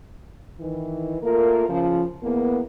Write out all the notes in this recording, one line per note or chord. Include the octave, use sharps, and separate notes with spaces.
D#3 E3
A3 A#3 F4 A#4
C#3 F3
E2 A#3 B3